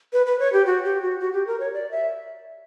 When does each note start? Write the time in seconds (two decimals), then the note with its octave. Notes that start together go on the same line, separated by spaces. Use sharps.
0.13 B4
0.26 B4
0.40 C#5
0.53 G4
0.66 F#4
0.84 G4
1.02 F#4
1.20 F#4
1.33 G4
1.47 A#4
1.60 C#5
1.73 D5
1.91 E5